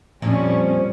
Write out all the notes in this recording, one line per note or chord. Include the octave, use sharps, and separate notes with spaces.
F2 A#2 F3 G3 C#4